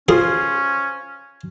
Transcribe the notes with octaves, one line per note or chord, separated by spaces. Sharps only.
C#4 F4 G#4 C5